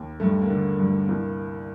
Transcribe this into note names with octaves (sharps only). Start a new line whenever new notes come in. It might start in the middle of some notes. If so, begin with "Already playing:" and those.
Already playing: D#2
G2 A3
A#3
D3
G2
A3
C2 A#3